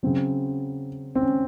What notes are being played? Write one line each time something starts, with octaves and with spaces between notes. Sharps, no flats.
C#3 F#3 C4
C4
C#4